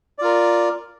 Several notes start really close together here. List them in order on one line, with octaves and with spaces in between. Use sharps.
D5 F4 A#4